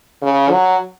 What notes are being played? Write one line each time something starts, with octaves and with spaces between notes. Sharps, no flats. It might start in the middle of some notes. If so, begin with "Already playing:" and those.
C#3
F#3